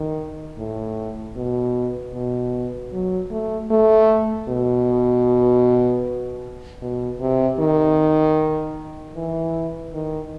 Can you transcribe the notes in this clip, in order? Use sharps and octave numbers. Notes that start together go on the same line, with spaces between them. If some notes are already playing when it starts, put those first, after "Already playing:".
Already playing: D#3
A2
B2
B2
F#3
A3
A3
B2
B2
C3
D#3
E3
D#3